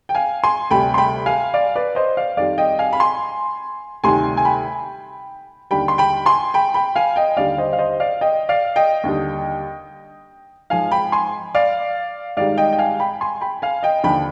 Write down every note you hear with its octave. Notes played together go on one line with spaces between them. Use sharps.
G5
F5 G#5
G#5 C6
D2 C3 G3 G5 B5
C6
G5 B5
F5 G#5
D5 F5
B4 D5
C5 D#5
D5 F5
F2 D#3 G3 D5 F5
D#5 G5
F5 G#5
B5
G#5 C6
D2 C3 D#3 G3 G#5 C6
G#5
G5 B5
D#2 D3 G3 G5 B5
C6
G5 B5
G#5 C6
G5 B5
G5 B5
F5 G#5
D#5 G5
D#2 D3 G3 D5 F5
C5 D#5
F5
C5 D#5
D5 F5
D#5 G5
D5 F5
D#5 G5
D#2 D3 G3
G#2 F3 F5 G#5
G5 B5
G#5 C6
D5 F5
G#2 D#3 G3 D5 F5
D#5 G5
G5
F5 G#5
G5 B5
G#5 C6
G5 B5
F5 G#5
D#5 G5
D#2 D3 F3 G5 B5